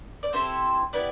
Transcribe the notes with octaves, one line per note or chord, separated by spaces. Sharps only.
D5
C4 E4 G4 A4 C5
B3 E4 G4 B4 D5